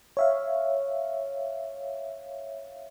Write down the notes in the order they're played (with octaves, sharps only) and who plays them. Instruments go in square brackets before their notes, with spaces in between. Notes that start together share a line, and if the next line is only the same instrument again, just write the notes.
[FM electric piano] C#5 E5 F5